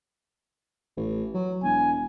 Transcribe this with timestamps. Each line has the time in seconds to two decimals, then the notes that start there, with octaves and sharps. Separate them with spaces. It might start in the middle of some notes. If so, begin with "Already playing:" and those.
0.96 A1
1.34 F#3
1.63 E1 G#5